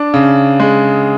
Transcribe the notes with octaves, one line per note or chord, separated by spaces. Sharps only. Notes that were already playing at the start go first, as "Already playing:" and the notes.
Already playing: D4
C#3
G#3